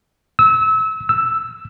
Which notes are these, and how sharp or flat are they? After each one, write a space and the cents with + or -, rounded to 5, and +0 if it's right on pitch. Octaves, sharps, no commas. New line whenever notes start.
E6 -30
E6 +0